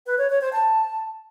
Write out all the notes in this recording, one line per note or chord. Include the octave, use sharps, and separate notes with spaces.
B4
C#5
C#5
C5
A5